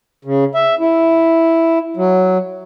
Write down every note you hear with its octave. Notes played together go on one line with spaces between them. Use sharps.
C#3
E5
E4
F#3